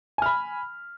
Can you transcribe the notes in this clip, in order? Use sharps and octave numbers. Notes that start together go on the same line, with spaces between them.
G#5 B5 F6